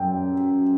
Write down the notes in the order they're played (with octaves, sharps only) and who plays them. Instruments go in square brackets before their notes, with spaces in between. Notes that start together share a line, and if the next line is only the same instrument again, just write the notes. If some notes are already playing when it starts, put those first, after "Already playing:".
Already playing: [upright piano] F#2 G5